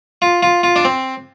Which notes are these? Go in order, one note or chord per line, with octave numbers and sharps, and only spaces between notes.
F4
F4
F4
D4
C4